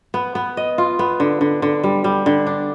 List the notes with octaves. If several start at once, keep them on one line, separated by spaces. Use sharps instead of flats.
B3
B3
D#5
F4
B3
D3
D3
D3
G3
G3
D3
D4